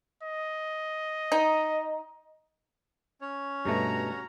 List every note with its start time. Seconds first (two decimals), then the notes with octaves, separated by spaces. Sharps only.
0.23 D#5
1.32 D#4
3.21 C#4 C#5
3.66 G2 B2 A3 F#4 A#5